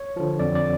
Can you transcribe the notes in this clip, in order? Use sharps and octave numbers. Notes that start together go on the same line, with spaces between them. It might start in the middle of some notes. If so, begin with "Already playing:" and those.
Already playing: C#5
D3 F3
F2 D5
D5